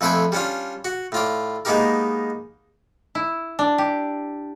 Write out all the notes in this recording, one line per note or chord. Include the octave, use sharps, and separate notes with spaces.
F2 A3 B4 C5 G5 G#5
G3 C#4 D4 F4
F#4
A2 F4 D5
G#3 A#3 B3 D#4 G4 A#4
E4
D4
G4